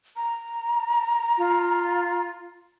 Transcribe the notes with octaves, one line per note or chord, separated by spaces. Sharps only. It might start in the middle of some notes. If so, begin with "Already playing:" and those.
A#5
F4